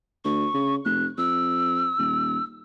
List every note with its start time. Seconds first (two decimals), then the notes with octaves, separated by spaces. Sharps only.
0.25 D2 C#6
0.54 C#3
0.85 F1 F#6
1.18 F2 E6
1.98 D#1